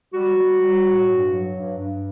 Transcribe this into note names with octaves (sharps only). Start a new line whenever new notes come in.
G3 F#4
G3
G3
A2
G2
F#3
G2
G2